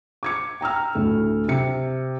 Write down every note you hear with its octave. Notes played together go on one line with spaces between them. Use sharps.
D6 G#6 C#7
G5 A#5 E6 F6
D2 A2 A3
C3 C#7